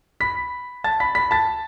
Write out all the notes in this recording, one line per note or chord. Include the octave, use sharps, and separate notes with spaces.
B5 B6
A5 A6
B5 B6
B5 B6
A5 A6